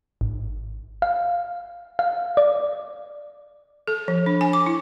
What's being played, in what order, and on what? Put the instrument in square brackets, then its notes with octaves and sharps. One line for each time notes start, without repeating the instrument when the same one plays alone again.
[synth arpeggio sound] G#1
F5
F5
D5
[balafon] A4
F3
D4
G#5
D6
E4